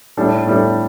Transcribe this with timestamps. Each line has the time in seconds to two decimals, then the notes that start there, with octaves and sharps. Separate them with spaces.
0.17 A2 G3 D4 A4
0.46 A2 G3 D4 A4